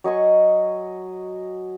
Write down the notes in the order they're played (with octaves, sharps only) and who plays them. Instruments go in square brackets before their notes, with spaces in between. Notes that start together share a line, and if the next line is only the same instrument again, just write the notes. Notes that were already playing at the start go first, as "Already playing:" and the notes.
[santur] F#3 D#5 G#5 C#6